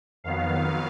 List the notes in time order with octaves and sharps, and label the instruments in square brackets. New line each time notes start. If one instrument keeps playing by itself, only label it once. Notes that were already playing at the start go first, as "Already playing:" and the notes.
[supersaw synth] F2 D#3 F#3 B3 F5